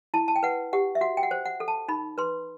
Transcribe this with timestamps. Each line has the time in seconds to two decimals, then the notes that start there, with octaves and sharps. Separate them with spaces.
0.14 E4 A5
0.28 A5
0.36 G5
0.43 B4 F#5
0.73 G4 F#5
0.95 E5
1.01 F#4 F#5
1.17 G5
1.23 F#5
1.31 C5
1.45 F#5
1.60 A4
1.68 A5
1.88 D#4 B5
2.18 B4 C6